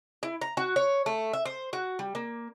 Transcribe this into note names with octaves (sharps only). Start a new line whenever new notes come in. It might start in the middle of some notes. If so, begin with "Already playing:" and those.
E4
A#5
F#4
C#5
A3
E5
C5
F#4
G3
A#3